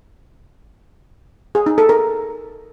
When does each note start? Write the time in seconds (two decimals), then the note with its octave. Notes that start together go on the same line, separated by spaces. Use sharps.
1.55 G#4
1.66 D#4
1.78 A4
1.89 A#4